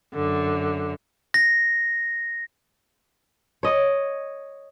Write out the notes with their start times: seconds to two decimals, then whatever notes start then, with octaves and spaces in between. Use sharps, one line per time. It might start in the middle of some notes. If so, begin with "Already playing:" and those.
0.13 F#2 D3
1.34 A#6
3.63 C#5 D#5